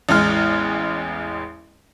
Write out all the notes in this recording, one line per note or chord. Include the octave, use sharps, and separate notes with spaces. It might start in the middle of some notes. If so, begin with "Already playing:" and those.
A1 E2 G#3 F6